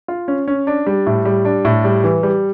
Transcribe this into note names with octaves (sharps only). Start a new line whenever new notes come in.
F4
C#4
C#4
D4
G3
A2
G3
D4
A2
G3
E3
G3